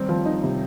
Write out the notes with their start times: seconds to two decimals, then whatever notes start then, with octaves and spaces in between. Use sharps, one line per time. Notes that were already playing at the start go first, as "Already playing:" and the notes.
Already playing: D#3 G3 C4
0.09 F3
0.25 D#4
0.43 C3